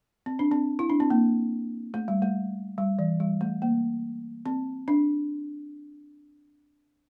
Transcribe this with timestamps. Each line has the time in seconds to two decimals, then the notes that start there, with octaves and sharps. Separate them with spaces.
0.26 C4
0.39 D4
0.51 C4
0.79 E4
0.90 D4
1.00 C4
1.10 A#3
1.94 A3
2.08 G3
2.22 A3
2.78 G3
2.99 E3
3.20 G3
3.41 A3
3.62 A#3
4.46 C4
4.88 D4